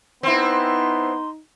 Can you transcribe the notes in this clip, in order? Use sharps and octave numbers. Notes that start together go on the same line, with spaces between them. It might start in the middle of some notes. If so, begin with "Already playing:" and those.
B3 C4 D#4 E4 C6